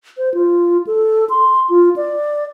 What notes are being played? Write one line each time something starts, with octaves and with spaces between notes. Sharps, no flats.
C5
F4
A4
C6
F4
D5